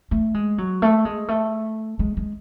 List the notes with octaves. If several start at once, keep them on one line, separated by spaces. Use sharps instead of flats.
A3
G#3
F#3
A3
G#3
A3
G#3
G#3